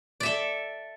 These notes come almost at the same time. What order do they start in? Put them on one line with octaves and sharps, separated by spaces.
D5 E5 A4